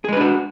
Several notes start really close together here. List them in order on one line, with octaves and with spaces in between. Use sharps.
G#4 G#3 B4 D4 F#4